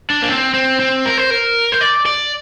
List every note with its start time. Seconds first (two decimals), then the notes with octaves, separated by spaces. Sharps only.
0.10 D4
0.22 A#3
0.29 C4
0.54 C4
0.80 C4
1.06 A#4
1.17 C5
1.30 A#4
1.72 C5
1.81 D5
2.06 D5